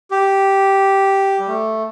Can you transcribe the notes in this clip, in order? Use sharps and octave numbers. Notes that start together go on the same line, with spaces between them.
G4
G3
A3